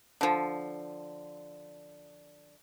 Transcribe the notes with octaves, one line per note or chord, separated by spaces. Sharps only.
D3 F3